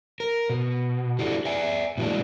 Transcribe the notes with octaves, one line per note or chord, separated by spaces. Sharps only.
A#4
B2
D4 E4 F#4 G4 A4
D5 E5 G#5
A#2 E3 F#3 G#3 D4